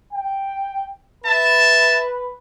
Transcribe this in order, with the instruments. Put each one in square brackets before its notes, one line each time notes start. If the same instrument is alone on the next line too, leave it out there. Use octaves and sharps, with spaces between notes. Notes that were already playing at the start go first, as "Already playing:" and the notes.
[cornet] G5
[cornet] B4 [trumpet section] E5 A5